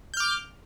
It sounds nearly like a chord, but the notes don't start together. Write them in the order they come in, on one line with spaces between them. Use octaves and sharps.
G6 F6 D6